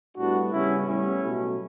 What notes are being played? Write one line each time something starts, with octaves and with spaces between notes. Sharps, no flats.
A2 G3 B3 D4 F#4
C#3 G3 B3 C#4 E4
A2 G3 B3 C#4 E4
B2 F#3 A3